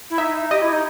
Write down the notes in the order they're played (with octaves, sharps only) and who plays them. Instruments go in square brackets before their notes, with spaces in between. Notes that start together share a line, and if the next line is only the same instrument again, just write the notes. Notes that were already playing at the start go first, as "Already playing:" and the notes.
[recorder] E4
[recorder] D#4 [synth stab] E5
[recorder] G4 [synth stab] D#5
[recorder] E4
D#4